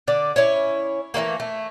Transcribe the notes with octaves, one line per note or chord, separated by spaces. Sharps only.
D3 D5
C#4 E4 C#5
E3 F#3 A3 A#3
A3